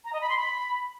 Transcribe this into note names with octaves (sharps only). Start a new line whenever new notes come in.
A#5
D#5
B5
C6
B5